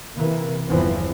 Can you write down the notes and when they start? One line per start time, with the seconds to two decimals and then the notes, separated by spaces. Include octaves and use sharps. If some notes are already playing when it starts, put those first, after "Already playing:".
0.15 C3 E3 A#3
0.67 G1 E2 E3 F3 C4